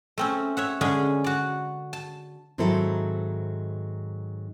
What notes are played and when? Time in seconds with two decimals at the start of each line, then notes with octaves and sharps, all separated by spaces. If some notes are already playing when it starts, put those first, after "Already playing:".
0.18 A3 C4 C#4
0.57 C#5 E5 F#5
0.81 D3 G#3 C#4 G#4
1.24 F#4 D5
1.93 A5
2.58 G#2 D#3 F#3 C4 E4 A4